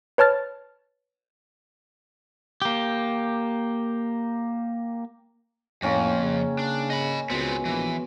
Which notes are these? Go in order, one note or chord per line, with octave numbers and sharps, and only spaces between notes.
B4 C#5 A5 F6 A6
A#3 G4
F2 A2 A#3 C#4 G5
C#3
D4
D#5 B5
C#2 B2 G#3 B3 C4
A#1 E3